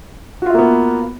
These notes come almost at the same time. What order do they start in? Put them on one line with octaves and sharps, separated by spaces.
F#4 F4 E5 A#3 B3